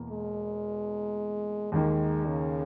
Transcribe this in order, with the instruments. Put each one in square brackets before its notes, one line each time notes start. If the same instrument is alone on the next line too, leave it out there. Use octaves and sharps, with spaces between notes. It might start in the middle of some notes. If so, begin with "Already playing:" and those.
Already playing: [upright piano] E2 B2 A#3
[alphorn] G#3
[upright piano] D#2 D#3 A#3 [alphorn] G#3
[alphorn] C#3